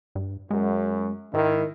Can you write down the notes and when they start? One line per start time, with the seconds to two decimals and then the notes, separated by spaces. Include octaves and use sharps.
0.15 G2
0.50 F#2 G#3
1.34 G#2 D#3 E4